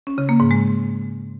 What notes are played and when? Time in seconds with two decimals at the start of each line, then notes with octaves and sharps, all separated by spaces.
0.07 C#4
0.18 C#3
0.29 A#3
0.40 G#2
0.51 G#3